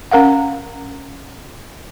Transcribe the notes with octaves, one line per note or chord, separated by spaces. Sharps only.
C#4 A#4 F5 F#5